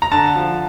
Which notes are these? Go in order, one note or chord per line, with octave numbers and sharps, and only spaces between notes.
A#5
D3 A5
F3